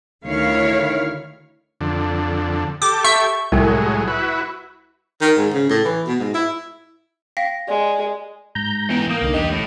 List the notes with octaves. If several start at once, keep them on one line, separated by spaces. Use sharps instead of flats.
D2 D#3 E4 C#5 F5
F2 D3
G4 A4 D6
E5 C#6
C2 A2 F#3 G#3
E4 F#4 B4
D#3
G#2
C#3
A2
E3
B2
G#2
E4
F5 G5 A#6 B6
G#3 D5
G#2 A#5 G6
E3 B3 G5
A#3 G5 D#6
C2 D3 D#4
E2 D4 G4 D#5
A2